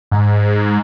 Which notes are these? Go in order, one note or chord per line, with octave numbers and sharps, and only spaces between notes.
G#2